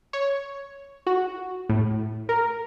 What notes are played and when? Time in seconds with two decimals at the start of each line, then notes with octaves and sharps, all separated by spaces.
0.13 C#5
1.07 F#4
1.69 A2
2.29 A#4